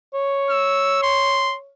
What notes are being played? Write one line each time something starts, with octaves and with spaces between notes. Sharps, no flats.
C#5
E6
C6